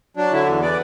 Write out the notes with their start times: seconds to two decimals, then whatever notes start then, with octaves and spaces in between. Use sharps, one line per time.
0.17 F#3 D4
0.32 D3 E4
0.47 E2
0.61 B3 D5